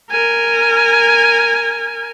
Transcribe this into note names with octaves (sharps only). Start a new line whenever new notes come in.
A#4 G#5